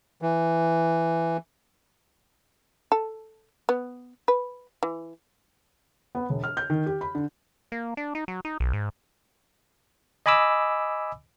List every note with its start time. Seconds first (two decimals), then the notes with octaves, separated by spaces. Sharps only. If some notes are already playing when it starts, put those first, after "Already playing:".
0.22 E3
2.92 A4
3.69 B3
4.28 B4
4.83 E3
6.15 B3
6.30 E1
6.44 F6
6.57 G6
6.70 D#3
6.86 G4
7.01 B5
7.15 D3
7.72 A#3
7.97 D4
8.15 D#4
8.28 F#3
8.45 D#4
8.60 B1
8.73 G#2
10.26 D#5 G#5 B5 D6 E6